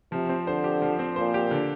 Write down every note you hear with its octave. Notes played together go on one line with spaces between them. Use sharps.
C3 F3
C4
D3 C5
G4
F3
C4
A#2 C5
G4
D3